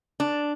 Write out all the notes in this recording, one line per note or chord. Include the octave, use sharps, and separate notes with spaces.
D4